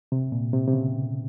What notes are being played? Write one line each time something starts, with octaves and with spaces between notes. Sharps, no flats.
C3
A#2
C3
C3
C#3